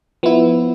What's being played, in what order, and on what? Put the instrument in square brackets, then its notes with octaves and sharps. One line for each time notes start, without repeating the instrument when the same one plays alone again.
[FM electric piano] F3 B3 E4